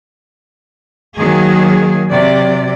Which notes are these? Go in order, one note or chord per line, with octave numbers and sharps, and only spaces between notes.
D#3 F#3 A#3 G#4
C3 F#3 D5